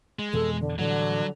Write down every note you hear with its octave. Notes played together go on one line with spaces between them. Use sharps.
G#3
F2 B2 E3 A4
D3
A2 D3 E3 F#3 G3